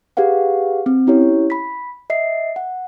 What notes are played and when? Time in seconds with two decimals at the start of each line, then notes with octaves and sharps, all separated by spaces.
0.17 G4 G#4 B4 F5 F#5
0.86 C4
1.07 C#4 E4 G4 C#5
1.50 B5 B6
2.10 D#5 E5 C7
2.56 F#5